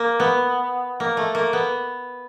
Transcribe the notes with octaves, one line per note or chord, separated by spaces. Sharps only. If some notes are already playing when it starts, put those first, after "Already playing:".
Already playing: A#3
B3
A#3
A3
A#3
B3